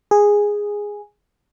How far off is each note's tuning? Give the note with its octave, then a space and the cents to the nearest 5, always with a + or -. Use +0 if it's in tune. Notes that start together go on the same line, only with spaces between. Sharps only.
G#4 -10